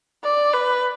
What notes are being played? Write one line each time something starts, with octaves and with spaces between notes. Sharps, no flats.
D5
B4